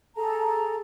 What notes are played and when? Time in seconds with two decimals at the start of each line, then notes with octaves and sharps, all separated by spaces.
0.16 G#4 A4 A5 A#5